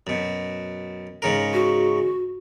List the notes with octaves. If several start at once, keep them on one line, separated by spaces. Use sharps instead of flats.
F#2 B2
G#2 C#3 A#4
F#4